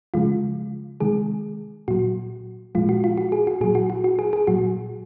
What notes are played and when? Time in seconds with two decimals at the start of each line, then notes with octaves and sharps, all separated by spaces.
0.14 C#3 F3 G#3 F4
1.00 C3 D#3 G#3 G#4
1.88 A#2 F#3 F#4
2.75 A#2 F3 G#3 F4
2.89 F#4
3.04 F4
3.18 F#4
3.32 G#4
3.47 F#4
3.61 A#2 F#3 G#4
3.75 F#4
3.90 F#4
4.04 F#4
4.19 G#4
4.33 G#4
4.47 A#2 F#3 F#4